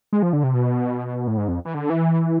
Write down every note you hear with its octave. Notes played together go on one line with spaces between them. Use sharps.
G#3
F3
D3
C3
B2
A2
G#2
F2
E3
D3
E3